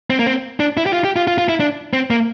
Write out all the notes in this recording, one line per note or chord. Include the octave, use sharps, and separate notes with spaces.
C4
A#3
C4
D4
E4
G4
F4
G4
F4
F4
F4
E4
D4
C4
A#3